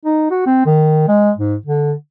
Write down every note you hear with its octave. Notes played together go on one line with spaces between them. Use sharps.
D#4
F#4
C4
D#3
G#3
G#2
D3